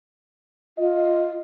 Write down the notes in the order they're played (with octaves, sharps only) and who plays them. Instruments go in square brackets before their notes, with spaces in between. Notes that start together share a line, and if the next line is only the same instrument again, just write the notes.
[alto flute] F4 [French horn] D#5